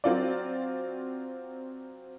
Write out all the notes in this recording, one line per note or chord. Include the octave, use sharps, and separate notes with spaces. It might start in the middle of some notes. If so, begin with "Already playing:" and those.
F#3 C4 F4 D5